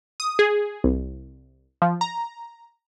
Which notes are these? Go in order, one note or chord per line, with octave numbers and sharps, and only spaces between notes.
D#6
G#4
C2
F3
A#5